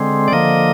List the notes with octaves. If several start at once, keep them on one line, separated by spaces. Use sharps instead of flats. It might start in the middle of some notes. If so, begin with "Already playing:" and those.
Already playing: D3 G#3 C4
D5
D3 F3 A#3 D#5